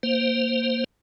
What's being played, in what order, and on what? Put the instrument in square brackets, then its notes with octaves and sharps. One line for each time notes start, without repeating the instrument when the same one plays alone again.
[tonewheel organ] A#3 C5